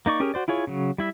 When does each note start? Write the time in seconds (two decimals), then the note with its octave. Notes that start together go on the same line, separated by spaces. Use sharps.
0.06 A#3 D#4 D5 C#6
0.20 C#4 G4 G#4 A#4
0.34 F#4 C5 D5
0.48 E4 F4 G#4 C#5
0.67 C#3 F#3
0.98 G3 E4 E5